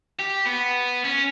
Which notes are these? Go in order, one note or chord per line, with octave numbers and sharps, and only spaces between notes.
G4
B3
C#4